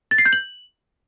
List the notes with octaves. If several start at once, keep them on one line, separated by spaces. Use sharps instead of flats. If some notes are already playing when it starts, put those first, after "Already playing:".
A6
C7
G6
F#7